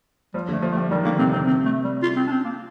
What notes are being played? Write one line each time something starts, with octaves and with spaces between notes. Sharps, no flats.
F3 G3
D3 A3
F3
A3
G3
D#3 G3
D3 A#3
C3 C4
C3 C4
C4
A3
G3
F4
C4
D4
C4
A#3